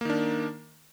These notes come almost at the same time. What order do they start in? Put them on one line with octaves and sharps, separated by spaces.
A#3 D#3 D4